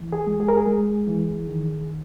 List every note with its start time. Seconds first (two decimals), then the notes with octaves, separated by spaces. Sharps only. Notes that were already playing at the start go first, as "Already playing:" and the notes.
Already playing: E3
0.12 G#4
0.27 G#3
0.40 G#4
0.48 A#4
0.57 G#4
0.67 G#3
1.07 E3
1.47 D#3